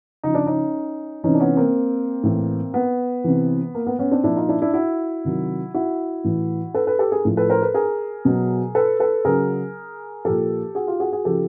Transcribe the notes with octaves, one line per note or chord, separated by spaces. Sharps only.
C#3 F3 D#4
D4
C#4 D#4
C3 E3 C#4 D#4
D4
B3 C#4
A#3 C4
A2 E3
B3
C3 E3
A#3
B3
B3 C#4
C4 D4
A#2 F3 D4 E4
D#4 F4
D4 E4
D4 E4
E4 F#4
C3 D#3 F#3
E4 F#4
A2 E3
A4 B4
A4 B4
G4 A4
G#4 A#4
A2 F3
A4 B4
A#4 C5
A4 B4
G#4 A#4
B2 F#3
A4 B4
A4 B4
C#3 F#3 G#4 A#4
A#2 F3 G4 A4
F#4 G#4
F4 G4
F#4 G#4
F#4 G#4
C#3 F3 G4 A4